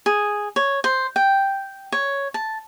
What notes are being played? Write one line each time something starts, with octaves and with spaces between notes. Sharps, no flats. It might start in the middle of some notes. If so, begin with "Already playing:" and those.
G#4
C#5
C5
G5
C#5
A5